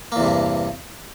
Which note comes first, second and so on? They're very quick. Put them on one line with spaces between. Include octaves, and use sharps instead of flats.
A#3 E2 C3 G2